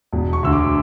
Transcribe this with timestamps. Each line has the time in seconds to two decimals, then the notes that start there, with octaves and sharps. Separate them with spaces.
0.13 E1
0.33 C#6
0.43 D2 D3 E6
0.53 D6